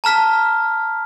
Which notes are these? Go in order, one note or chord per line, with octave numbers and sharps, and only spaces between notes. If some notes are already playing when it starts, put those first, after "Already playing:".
A5 A#5 F6 B6